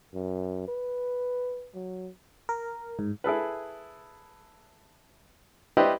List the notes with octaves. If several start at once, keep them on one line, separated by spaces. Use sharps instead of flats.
F#2
B4
F#3
A#4
G#2
E4 G#4 A4 B4
E4 G4 B4 C5 D5 D#5